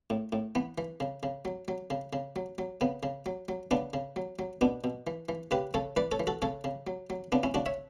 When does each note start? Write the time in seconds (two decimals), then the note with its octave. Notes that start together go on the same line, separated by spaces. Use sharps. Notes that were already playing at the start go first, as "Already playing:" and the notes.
0.10 A2
0.32 A2
0.55 E3 B3
0.78 E3
1.00 C#3
1.23 C#3
1.45 F#3
1.68 F#3
1.90 C#3
2.13 C#3
2.36 F#3
2.58 F#3
2.81 C#3 B3
3.03 C#3
3.26 F#3
3.49 F#3
3.71 C#3 B3 D4
3.93 C#3
4.16 F#3
4.39 F#3
4.61 B2 B3 D4
4.84 B2
5.07 E3
5.29 E3
5.51 C#3 G4 B4
5.74 C#3 A4 C#5
5.97 E3 B4 D5
6.12 A4 C#5
6.20 E3
6.27 F#4 A4
6.42 C#3 A4 C#5
6.64 C#3
6.87 F#3
7.10 F#3
7.32 C#3 B3 D4
7.43 C#4 E4
7.54 C#3 D4 F#4
7.66 C#5 E5